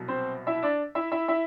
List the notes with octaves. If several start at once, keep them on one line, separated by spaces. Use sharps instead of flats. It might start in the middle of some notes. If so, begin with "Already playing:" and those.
Already playing: C2 B2 F#3
C4 C5
E4 E5
D4 D5
E4 E5
E4 E5
E4 E5